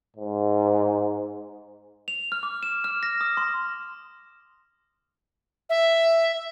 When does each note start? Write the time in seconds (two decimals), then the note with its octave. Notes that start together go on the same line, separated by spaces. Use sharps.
0.16 G#2
2.08 F7
2.32 F6
2.43 D6
2.63 E7
2.84 F6
3.03 A#6
3.21 D#6
3.37 C6
5.69 E5